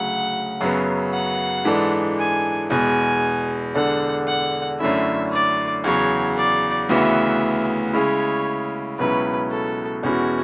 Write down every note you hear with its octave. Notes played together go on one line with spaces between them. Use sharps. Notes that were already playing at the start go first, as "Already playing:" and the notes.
Already playing: D2 C#3 F#3 F#5
F#2 C#3 F#3 B3
F#5
G#2 E3 G#3 D4 A4
G#5
E2 B2 G#3 G#5
E2 D3 G#3 D4 A4 F#5
F#5
F#2 D3 A3 C#4 E4 E5
D5
E2 C#3 F#3 C#5
D5
D2 C#3 E3 B3 F#4 E5
C#3 G#3 C#4 E4 C#5
C#2 B2 F#3 C#4 E4 B4
A4
E2 B2 G#3 C#4 E4 F#4